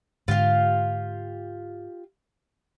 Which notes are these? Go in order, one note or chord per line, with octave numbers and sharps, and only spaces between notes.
G#2 D3 F4 G4 F5